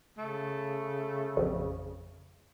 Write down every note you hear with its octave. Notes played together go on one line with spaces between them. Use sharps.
C#3 A3
A1 F2